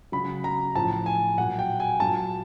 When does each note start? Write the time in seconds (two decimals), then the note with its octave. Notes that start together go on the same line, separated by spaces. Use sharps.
0.12 C#3 F#3 B5
0.44 A#5
0.75 A2 F3 A5
1.06 G#5
1.37 A#2 F#3 F#5
1.59 G5
1.80 G#5
2.00 A#2 F#3 A5